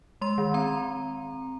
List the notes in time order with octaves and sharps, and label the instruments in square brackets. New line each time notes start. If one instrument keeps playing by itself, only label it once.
[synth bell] G#3 C6
D#3
C4 A#5